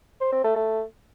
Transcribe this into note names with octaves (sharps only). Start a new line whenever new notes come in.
C5
C4
A3
A3